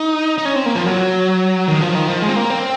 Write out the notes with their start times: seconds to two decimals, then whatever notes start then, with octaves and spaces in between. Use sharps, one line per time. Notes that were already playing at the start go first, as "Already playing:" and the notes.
Already playing: D#4
0.38 D#4
0.45 C#4
0.56 C4
0.66 A#3
0.75 F3
0.86 F#3
1.68 D#3
1.81 F3
1.95 D#3
2.09 F3
2.22 G#3
2.29 C4
2.36 A#3
2.50 C4